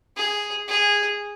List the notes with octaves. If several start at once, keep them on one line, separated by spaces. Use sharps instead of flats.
G#4
G#4